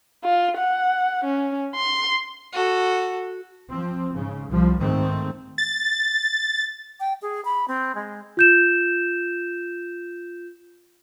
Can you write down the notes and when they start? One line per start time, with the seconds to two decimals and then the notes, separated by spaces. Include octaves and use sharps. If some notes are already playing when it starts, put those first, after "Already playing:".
0.24 F4
0.57 F#5
1.24 C#4
1.75 C6
2.53 F#4 A4
3.72 F3 C4
4.13 G#2 C#3
4.49 C2 F3 G3
4.79 G#2 D#3 A3 C4
5.58 A6
7.00 G5
7.22 G#4
7.45 B5
7.68 C4
7.95 G#3
8.37 F4 G6 E7